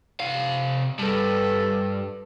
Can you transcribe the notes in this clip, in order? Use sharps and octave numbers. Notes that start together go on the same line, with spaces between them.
C3 F5
G2 A4 B4